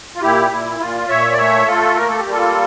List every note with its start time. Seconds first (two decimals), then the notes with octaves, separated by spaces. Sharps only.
0.16 F4
0.22 A#2 E4 G4
0.51 A#2 E4
0.80 A#2 F4
1.09 A#2 C#5 E5
1.32 D5
1.38 A3 C#5 E5
1.67 A3 F4 A4
1.96 A#3 A#4
2.08 A4
2.19 G4
2.25 G3
2.31 F4 A4